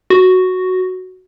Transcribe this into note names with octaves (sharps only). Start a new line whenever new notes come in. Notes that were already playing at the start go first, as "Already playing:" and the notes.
F#4